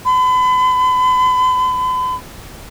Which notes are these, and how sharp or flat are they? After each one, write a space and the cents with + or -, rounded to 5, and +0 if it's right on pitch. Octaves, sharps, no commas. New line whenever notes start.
B5 +40